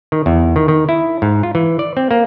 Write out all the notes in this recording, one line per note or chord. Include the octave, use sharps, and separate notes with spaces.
D#3
E2
D#3
D#3
E4
G#2
F4
E3
D5
C4
A#3